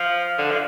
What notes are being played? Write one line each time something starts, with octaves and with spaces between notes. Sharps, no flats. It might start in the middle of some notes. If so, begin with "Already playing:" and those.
Already playing: F3
D3
F3